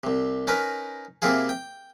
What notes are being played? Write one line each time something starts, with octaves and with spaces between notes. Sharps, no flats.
C2 C3
C#4 D#4 A#4 B4
C3 A#3 C4 E4 F4 G#4
G5